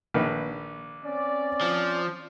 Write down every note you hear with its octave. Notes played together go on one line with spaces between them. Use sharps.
A#1 D#3 B4
C4 C#4 D5
F3